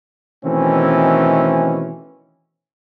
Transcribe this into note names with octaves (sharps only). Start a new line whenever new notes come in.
B2 D#3 E3 A3 C4 C#4